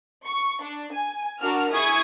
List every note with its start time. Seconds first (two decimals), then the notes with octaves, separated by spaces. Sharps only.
0.25 C#6
0.62 D4
0.92 G#5
1.42 D4 F#4 A#4 F6
1.73 E4 G#4 C#6 D#6 G#6